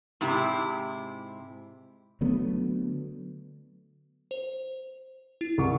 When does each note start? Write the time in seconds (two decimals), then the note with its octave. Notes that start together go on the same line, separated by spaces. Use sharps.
0.21 G#2 C3 E4 G4
2.21 D3 F#3 A3 B3
4.31 C5
5.41 E4
5.58 C2 C#6